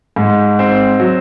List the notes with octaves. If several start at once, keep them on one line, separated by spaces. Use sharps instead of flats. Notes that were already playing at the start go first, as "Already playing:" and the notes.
G#2
C4
F#3